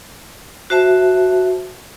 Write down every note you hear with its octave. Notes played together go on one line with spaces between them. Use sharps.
F#4 C5 E5 A5